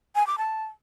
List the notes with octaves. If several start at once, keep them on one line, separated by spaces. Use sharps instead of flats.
G#5
D6
A5